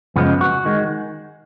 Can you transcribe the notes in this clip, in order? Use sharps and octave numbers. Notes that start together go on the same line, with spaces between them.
F#2 C#3 F3 G#3 B3
F#4
D#3 G#3